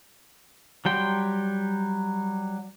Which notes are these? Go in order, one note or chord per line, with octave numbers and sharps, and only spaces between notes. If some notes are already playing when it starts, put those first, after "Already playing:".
F#3 G3 G5 C6